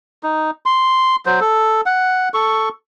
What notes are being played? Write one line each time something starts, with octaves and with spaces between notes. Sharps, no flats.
D#4
C6
F#3 C5
A4
F#5
A4 C#6